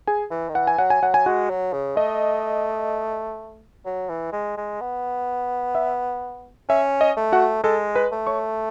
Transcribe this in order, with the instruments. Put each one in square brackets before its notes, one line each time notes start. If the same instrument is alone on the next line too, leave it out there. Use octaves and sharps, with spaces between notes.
[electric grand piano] G#4 G#5
[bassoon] E3
D#3
[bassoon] E3 [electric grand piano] F#5
[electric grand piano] G#5
[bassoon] F#3 [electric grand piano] F#5
[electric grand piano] G#5
[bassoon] F#3 [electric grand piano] F#5
[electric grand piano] G#5
[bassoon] G#3 [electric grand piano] F#4 F#5
[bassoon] F#3
C#3
[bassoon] A3 [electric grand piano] D#5
[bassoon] F#3
E3
G#3
G#3
B3
[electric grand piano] E5
[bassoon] C#4 [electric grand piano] E5
[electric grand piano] D#5
[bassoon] A3
[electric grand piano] F#4 F#5
[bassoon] G#3 [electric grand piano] A4 A5
[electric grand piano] B4 B5
[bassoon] A3
[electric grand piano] C#5 C#6